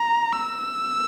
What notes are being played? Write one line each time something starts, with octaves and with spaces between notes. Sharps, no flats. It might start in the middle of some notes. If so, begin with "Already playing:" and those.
Already playing: A#5
E6